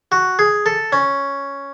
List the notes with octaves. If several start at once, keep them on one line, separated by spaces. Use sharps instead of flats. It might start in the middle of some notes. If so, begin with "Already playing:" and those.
F#4
G#4
A4
C#4